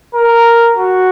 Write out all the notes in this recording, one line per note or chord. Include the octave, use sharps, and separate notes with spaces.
A#4
F#4